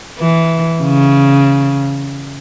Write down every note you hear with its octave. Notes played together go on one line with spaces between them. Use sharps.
E3
C#3